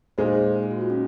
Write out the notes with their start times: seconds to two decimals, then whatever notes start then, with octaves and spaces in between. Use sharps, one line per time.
0.18 A#2 G#3 D#4 G#4 C5
0.63 G#4
0.71 F#4
0.81 F4
0.90 C#4